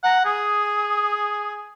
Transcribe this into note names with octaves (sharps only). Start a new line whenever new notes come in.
F#5 A#5
G#4 D#6